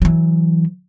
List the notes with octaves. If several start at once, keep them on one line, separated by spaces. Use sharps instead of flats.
E3 F#3